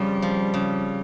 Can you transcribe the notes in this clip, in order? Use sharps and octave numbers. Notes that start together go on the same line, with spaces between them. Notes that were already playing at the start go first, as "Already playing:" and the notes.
Already playing: F2 C#3 G3
F3
C#3